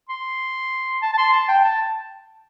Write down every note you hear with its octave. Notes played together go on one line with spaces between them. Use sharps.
C6
A5
A5
C6
A5
G5
A5